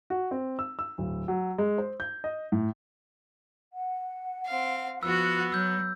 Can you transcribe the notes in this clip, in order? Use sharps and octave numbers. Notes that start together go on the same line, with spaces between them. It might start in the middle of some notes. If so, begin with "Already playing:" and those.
F#4
C4
E6
E6
D1
F#3
G#3
C5
G6
D#5
A2
F#5
C4 F5
F3 B3 F#4 E6 F#6
F#3 E6 G6